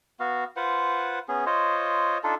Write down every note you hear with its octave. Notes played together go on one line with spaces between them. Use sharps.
B3 F#4 F5
F4 B4 C5 F#5
B3 C#4 G#4
F4 C5 C#5 D#5
D4 D#4 F4 A4